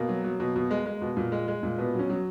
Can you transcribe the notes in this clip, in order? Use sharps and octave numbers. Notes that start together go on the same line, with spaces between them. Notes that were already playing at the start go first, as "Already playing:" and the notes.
Already playing: B2 A#3
F#3
F#3
B2
B2
G#3
G#3
B2
A#2
G#3
G#3
A#2
B2 B3
F#3
C#4
F#3